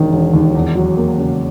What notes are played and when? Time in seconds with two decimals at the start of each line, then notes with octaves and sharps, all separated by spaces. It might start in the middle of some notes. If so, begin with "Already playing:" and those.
Already playing: E1 D#3
0.12 E1
0.34 D#2
0.55 E2
0.75 F#3
0.97 A#3
1.18 C#3